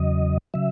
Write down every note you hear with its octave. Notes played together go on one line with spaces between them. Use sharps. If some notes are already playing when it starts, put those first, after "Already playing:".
Already playing: E2 C#3 F#3 D#5
C#3 F#3 E5